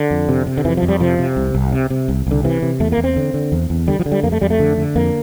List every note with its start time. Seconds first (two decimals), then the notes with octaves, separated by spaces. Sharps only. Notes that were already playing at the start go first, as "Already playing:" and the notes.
Already playing: D3
0.11 F2
0.29 C3
0.47 C3
0.57 D3
0.65 F2 E3
0.77 F3
0.82 F2
0.88 G3
1.00 C3 F3
1.19 C3
1.37 C2
1.54 C2
1.72 C3
1.90 C3
2.08 C2
2.27 C2 D3
2.44 C3 E3
2.62 C3
2.80 E2 A3
2.92 A#3
2.98 E2
3.04 C4
3.16 D3
3.34 D3
3.52 E2
3.70 E2
3.88 D3 G3
3.99 F3
4.06 D3
4.12 G3
4.23 F2 A#3
4.32 A3
4.41 F2 G3
4.50 A3
4.60 D3
4.77 D3
4.96 F2 A#3